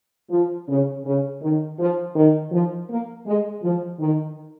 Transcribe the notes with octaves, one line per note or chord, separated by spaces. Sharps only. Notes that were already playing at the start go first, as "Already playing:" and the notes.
F3
C#3
C#3
D#3
F3
D#3
F3
A#3
G#3
F3
D#3